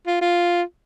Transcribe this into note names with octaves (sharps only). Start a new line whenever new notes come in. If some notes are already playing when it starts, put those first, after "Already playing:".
F4
F4